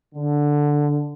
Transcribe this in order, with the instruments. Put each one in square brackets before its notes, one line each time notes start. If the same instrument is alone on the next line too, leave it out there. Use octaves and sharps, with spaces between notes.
[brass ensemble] D3